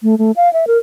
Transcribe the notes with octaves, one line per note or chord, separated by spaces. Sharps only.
A3
A3
F5
E5
A#4